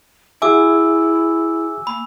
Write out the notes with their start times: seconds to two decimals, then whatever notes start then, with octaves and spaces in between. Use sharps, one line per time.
0.42 E4 F#4 G#4 E5 G#5 D6 E6
1.87 A#3 B5